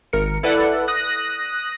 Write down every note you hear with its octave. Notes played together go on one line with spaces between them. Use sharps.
G#1 A#4 C#7
E4 A4 B4 D5 F#5
D#6 F#6 A#6